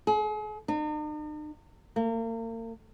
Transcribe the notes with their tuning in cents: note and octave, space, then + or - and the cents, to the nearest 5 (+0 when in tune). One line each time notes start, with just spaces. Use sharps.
G#4 +40
D#4 -45
A#3 -40